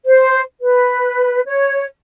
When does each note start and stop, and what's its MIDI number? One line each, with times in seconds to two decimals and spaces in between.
0.05 0.41 72
0.61 1.41 71
1.46 1.84 73